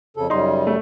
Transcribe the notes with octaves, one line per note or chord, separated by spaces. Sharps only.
F2 C#3 A4
F#2 C#3 G3 D#4 C6
A3